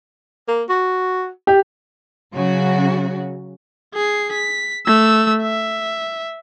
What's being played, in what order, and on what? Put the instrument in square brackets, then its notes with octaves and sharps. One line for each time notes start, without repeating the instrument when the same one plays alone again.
[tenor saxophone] A#3
F#4
[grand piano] G4
[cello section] C#3 F#3 F#4
[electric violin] G#4 C7
B6
A3 E6
E5